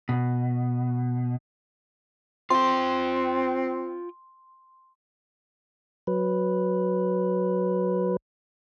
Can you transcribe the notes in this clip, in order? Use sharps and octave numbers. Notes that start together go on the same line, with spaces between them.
B2
C4 F4 G5 C6
F#3 B4